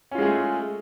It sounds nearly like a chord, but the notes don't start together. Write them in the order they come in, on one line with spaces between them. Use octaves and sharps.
C#4 F4 G#3 G#4 A3